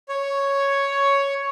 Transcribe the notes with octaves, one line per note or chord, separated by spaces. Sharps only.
C#5